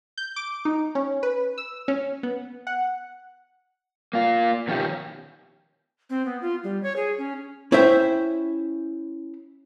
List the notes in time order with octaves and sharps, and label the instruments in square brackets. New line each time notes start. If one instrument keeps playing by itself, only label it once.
[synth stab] G6
D6
D#4
C#4
B4
E6
C#4
B3
F#5
[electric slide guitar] A#3 F4
B2 D#3 F3 C#4 D#4 G4
[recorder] C4
B3
F4
G3
C#5
G#4
C#4
[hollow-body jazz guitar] C#4 E4 C5 E5 G5